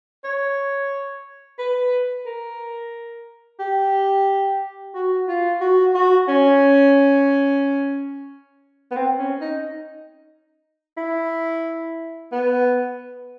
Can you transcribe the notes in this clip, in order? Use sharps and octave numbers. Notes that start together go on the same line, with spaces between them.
C#5
B4
A#4
G4
F#4
F4
F#4
F#4
C#4
B3
C4
C#4
D#4
E4
B3